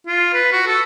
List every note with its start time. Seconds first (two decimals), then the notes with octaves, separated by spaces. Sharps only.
0.07 F4
0.34 B4
0.52 F#4
0.67 A4